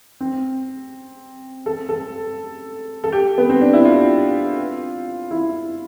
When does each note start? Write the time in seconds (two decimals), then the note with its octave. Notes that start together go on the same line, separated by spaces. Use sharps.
0.21 C4
1.66 A4
1.89 A4
3.04 A4
3.12 G4
3.38 B3
3.49 C4
3.61 D4
3.73 E4
3.85 F4
5.31 E4